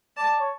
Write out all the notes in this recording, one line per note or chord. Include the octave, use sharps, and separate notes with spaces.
D5 A5
C#5